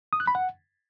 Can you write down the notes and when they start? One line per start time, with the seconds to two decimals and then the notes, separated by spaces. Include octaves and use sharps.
0.13 D#6
0.20 F#6
0.27 B5
0.35 F#5